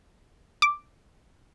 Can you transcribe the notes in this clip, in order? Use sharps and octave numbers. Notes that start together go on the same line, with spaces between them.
D6